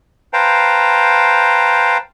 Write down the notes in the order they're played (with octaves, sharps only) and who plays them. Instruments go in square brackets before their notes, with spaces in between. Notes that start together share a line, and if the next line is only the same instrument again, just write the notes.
[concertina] B4 C5 F5 G5 A5 A#5